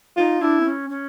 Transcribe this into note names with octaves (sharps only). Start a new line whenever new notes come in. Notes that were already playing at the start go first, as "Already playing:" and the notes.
D#4 F4
D4 E4
C4
C#4
C#4